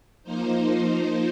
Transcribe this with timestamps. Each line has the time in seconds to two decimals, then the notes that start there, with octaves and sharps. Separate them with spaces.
0.23 F3 A#3 D#4 C5